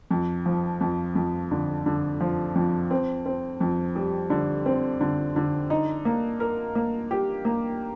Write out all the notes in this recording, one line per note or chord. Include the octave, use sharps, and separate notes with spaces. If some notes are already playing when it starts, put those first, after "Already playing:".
F2
F3
F2
F2
D3
D3
F3
F2
C4
C4
F2
G3
D3
C4
D3
D3
D#4
A#3
A#4
A#3
G4
A#3